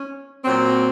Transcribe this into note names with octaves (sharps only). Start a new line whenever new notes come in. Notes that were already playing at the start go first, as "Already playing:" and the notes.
Already playing: C#4
A#2 F#3 C4